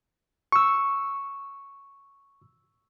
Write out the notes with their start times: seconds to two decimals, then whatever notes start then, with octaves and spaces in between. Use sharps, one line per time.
0.52 C#6 E6